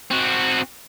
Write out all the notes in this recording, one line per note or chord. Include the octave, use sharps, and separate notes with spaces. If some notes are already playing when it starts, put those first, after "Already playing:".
C4 F#4